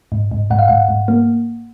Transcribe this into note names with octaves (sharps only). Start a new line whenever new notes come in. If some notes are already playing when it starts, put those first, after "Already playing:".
G#2
G#2
G#2 F#5
F5
G#2 F#5
G#2
A#3